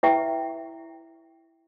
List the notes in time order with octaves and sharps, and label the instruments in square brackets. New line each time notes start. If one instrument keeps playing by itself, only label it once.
[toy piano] E4 B4 E5 G5 C#6